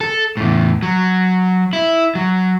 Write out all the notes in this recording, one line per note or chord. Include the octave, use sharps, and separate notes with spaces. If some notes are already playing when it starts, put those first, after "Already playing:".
A4
E2 A2
F#3
E4
F#3